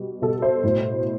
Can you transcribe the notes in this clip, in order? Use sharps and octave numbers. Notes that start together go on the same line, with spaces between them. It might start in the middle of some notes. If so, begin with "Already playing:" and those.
Already playing: B2 G3
B2 A4
C5
A2